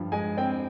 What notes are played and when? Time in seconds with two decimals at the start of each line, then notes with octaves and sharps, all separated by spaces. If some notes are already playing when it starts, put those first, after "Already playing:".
Already playing: G2 F3
0.12 G#3 G#5
0.37 C4 G5